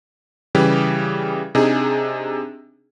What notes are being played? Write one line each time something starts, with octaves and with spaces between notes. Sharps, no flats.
C#3 E3 G3 G4
C3 D4 D#4 G#4